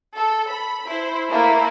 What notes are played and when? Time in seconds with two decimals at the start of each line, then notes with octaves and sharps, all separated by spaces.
0.15 A4
0.51 B5
0.87 E4 C5
1.30 A3 A#3 E4